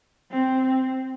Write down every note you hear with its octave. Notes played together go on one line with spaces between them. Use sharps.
C4